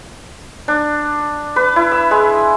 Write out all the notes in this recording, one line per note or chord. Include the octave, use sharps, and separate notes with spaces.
D4
B4
E4
E6
G#3